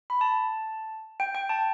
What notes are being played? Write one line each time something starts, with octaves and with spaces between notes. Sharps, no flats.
B5
A5
G5
G5
A5